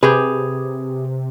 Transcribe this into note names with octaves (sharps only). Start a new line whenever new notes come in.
C3 G4 G#4 B4